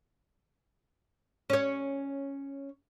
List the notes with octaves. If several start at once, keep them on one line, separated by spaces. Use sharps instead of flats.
C#4 C#5